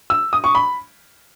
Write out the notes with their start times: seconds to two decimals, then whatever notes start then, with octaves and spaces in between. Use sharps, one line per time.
0.10 E6
0.33 D#6
0.44 C#6
0.55 B5